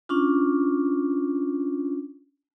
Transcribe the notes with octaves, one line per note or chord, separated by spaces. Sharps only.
C#4 D4 F4